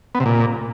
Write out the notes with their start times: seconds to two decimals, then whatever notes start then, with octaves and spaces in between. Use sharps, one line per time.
0.15 B3
0.20 C3
0.26 A#2